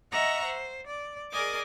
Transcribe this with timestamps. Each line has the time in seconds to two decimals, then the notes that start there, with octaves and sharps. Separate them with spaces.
0.12 D#5 E5 F#5 A#5 C#6
0.45 C5
0.87 D5
1.32 G#4 A#4 D5 D#5 G#5 D6